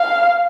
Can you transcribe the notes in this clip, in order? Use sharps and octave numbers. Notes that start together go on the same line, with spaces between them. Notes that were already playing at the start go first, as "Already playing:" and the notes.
Already playing: F5